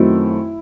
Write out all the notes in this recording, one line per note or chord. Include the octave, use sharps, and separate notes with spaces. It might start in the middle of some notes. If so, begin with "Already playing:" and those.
Already playing: F#2 D#3 F#3 A3 C4 E4